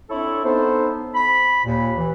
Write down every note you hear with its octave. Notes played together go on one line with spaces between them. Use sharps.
C4 D4 E4 A4 C#5
B3 D#4 A4 C5
B5
D#2 A#2
E3